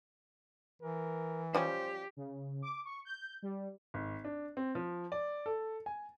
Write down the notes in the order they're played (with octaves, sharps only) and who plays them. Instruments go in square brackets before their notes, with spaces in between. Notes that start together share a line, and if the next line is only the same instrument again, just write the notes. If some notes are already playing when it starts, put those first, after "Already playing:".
[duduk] E3 [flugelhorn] A#4
[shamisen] F3 G3 C#4 [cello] G4 [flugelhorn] C5
[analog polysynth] C#3
D6
C#6
G6
G3
[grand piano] G#1
D4
C4
F3
D5
A4
G#5